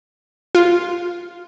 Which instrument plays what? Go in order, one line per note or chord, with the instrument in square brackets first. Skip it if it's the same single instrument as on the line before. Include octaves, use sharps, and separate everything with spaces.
[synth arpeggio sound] F4